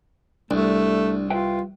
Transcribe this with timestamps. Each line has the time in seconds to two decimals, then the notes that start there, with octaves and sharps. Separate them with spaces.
0.51 C2 A3 D4
1.30 F4 B4 E5 G5